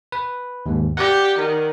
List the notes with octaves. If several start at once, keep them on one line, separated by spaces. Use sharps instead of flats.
B4
D#2 G#2
G4 D5 F#5
D#3